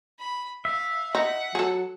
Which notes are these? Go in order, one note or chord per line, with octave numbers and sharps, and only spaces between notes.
B5
E5 F5
D#4 F#5
F#3 G#4 A4